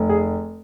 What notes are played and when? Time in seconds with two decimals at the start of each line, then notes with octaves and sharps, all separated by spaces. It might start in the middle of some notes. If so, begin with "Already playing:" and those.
Already playing: F1
0.09 G#4